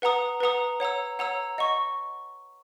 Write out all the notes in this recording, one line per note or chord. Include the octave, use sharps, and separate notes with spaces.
B4 F#5 A#5 D#6
B4 F#5 A#5 D#6
C#5 F#5 A#5 E6
C#5 F#5 A#5 E6
D#5 F#5 C#6